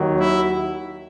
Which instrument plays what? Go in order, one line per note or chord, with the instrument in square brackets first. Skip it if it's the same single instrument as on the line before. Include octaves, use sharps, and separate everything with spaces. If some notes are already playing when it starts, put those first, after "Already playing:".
Already playing: [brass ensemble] D#2 D#3 F#3
E4